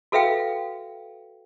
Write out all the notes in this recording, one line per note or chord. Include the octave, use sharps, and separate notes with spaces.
F#4 A4 B4 E5 F5 G5